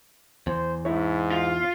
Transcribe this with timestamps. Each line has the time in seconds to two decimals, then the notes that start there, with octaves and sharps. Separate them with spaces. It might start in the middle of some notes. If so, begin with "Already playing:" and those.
0.47 E2 C5
0.85 G#2 E4 C#5
1.31 F4